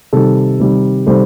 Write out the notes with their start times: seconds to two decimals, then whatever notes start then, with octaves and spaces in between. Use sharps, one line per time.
0.13 C3 D#3 G3 A4
0.60 C3 D#3 G3
1.06 C3 D#3 G3 A4 C5